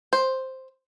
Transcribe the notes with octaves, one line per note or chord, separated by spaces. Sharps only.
C5